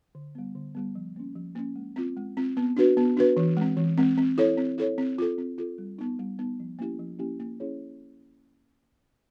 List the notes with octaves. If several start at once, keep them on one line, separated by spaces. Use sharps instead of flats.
D3
G3 B3
D3
G3 B3
F3
A#3 C#4
F3
A#3 C#4
G#3
C4 F4
G#3
C4 F4
B3
D4 F#4 B4
B3
D4 F#4 B4
E3
G#3 C4
E3
G#3 C4
C4
E4 A4 C#5
C4
E4 A4 C#5
C4
F4 A4
C4
F4 A4
G3
B3 D#4
G3
B3 D#4
F3
A#3 C#4 E4 G4
F3
A#3 C#4 E4 G4
A#3
C#4 E4 G#4 C#5